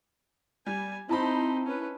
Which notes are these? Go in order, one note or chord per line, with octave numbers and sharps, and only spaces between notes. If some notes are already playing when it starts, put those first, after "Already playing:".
G3 G#5
C4 D#4 E4 C5 A5 B5
C#4 B4